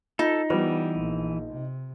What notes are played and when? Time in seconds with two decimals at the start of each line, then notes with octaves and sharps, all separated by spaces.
0.19 D#4 F4 A4
0.50 E3 G3 B3 F4 B4 C5
0.99 A#1
1.53 C3